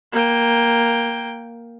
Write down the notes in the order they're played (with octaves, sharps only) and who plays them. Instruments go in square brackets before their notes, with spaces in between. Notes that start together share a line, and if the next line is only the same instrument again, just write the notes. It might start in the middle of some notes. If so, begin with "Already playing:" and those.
[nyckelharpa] A#3 G5